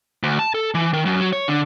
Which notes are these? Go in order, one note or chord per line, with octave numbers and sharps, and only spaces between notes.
D2
A5
A4
E3
D#3
F#2
F#3
C#5
D3